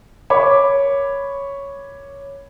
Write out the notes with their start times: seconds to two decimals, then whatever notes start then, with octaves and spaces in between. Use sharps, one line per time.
0.30 A#4 C#5 B5 D6